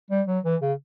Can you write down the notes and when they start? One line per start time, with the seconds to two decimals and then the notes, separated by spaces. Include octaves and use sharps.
0.10 G3
0.27 F#3
0.44 E3
0.61 C#3